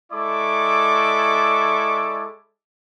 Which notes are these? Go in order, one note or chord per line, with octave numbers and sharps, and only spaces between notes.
G#3 E4 A4 D5 C#6 D6